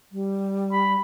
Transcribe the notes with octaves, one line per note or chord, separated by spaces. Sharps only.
G3
B5